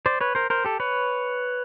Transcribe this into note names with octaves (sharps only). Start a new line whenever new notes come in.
C5 D5
B4 C#5
A#4 C5
A#4 C5
G4 A4
B4 C#5